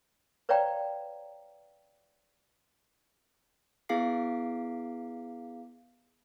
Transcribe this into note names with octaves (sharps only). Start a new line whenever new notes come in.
B4 C#5 D5 F5 G5 A#5
B3 E4 G#4 F5 D6 C7